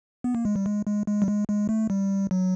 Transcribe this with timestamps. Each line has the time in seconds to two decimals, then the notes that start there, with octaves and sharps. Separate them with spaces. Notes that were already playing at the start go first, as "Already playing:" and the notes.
0.24 B3
0.35 A#3
0.45 G#3
0.56 G3
0.66 G#3
0.86 G#3
1.07 G#3
1.22 G3
1.27 G#3
1.48 G#3
1.69 A3
1.90 G3
2.31 F#3